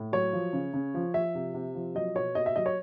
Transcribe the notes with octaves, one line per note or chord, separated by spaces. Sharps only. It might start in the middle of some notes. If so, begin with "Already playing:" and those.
Already playing: A2
F#3 C#5
F3
C#3
C#3
F3
F3 E5
C3
C3
F3
F#3 D#5
B2 C#5
B2 D#5
E5
F#3 D#5
C#5